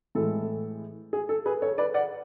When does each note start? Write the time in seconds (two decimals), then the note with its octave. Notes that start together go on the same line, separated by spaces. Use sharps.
0.15 A2 E3 G#3 A4
1.13 G#4
1.29 A4
1.46 G#4 B4
1.62 A4 C#5
1.78 B4 D5
1.94 D5 F#5